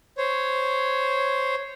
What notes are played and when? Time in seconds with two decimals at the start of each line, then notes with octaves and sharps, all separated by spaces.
0.18 C5 C#5